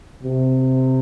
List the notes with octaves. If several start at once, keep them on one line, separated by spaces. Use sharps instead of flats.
C3